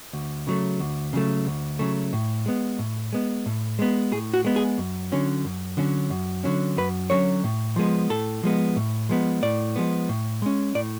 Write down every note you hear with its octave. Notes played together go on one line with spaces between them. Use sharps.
D2
C#3 F#3 A3
D2
C#3 F#3 A3
D2
C#3 F#3 A3
A2
G#3 B3
A2
G#3 B3
A2
G#3 B3
A2 G#4
F#4
G#3 B3
G#4
F#2
D3 F#3 C#4
F#2
D3 F#3 C#4
F#2
D3 F#3 C#4
F#2 B4
D3 F#3 C#4 C#5
A2
F3 G#3 B3
A2 A4
F3 G#3 B3
A2
F3 G#3 B3
A2 D5
F3 G#3 B3
A2
G#3 C#4
A2 D5